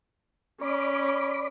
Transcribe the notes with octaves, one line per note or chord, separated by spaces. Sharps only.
C#4 D5 B5 D6